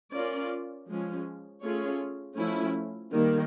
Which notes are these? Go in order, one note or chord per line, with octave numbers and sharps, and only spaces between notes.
C#4 F4 A#4 D5
F3 G#3 C#4
A3 C#4 F4 G#4 C#5
F3 A3 C#4 E4
D#3 G3 A#3